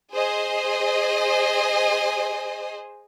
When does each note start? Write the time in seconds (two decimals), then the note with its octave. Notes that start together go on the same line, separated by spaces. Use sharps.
0.13 G#4 C5 D#5 G#5